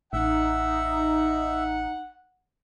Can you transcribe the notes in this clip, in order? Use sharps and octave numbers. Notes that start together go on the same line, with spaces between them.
A1 D#4 E5 F#5